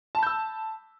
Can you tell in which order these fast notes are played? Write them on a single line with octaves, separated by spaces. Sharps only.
A5 B5 G6 E6